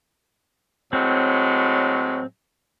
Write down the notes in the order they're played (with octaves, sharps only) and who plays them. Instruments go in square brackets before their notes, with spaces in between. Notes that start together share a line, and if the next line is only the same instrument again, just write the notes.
[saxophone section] A2 F#3 G#3 [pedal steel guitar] C4